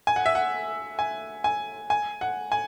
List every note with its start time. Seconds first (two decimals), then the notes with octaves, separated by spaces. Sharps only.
0.07 G#5
0.16 F#5
0.26 E5
0.35 F#5
0.99 G#5
1.44 G#5
1.90 G#5
2.21 F#5
2.52 G#5